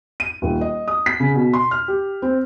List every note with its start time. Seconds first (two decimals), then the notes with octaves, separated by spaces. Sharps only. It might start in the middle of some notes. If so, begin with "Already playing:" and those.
0.20 D#7
0.42 D#1
0.61 D#5
0.88 D#6
1.06 B6
1.20 C#3
1.35 B2
1.53 C6
1.71 F6
1.88 G4
2.22 C4